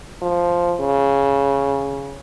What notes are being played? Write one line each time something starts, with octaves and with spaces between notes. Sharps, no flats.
F3
C#3